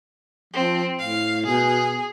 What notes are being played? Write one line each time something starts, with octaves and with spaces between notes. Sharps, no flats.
F3 C4
A2 F5
B2 G#4